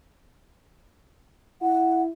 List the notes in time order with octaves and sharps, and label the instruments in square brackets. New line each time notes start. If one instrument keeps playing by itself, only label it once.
[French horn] E4 [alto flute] F#5